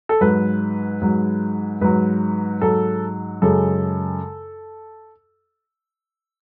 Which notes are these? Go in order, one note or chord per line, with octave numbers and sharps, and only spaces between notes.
A4
G#2 F#3 B4
G#2 F#3
G#2 F#3 B4
G#2 F#3 A4
F#2 C#3 G#3 A4